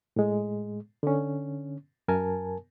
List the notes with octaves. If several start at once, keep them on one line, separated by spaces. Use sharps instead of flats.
A2 G#3
D3 C#4
F#2 A#4 G#5 A5